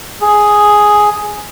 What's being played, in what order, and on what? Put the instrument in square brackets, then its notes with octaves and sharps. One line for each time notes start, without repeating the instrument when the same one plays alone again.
[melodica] G#4